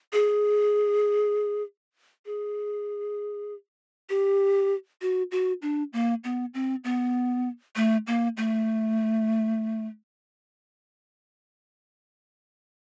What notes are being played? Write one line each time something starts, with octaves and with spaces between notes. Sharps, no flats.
G#4
G#4
G4
F#4
F#4
D4
A#3
B3
C4
B3
A3
A#3
A3